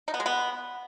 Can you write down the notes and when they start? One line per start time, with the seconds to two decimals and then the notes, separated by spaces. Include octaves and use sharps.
0.08 D#4
0.14 B3
0.20 G#3
0.26 B3